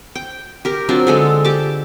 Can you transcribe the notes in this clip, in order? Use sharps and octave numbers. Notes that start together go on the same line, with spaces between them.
G5
G4 A#4
F#3 C4 D4 F4
D3 G#3 A4
G4 A5 D6